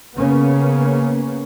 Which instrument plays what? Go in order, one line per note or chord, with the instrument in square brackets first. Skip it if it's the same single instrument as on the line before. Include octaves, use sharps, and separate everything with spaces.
[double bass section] C#3 A#3 B3 C#4